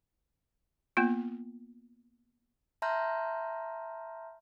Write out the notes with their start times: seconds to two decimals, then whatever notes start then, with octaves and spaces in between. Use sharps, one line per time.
0.97 A#3 B3 F4
2.82 E5 A5 A#5 C6 F6 G6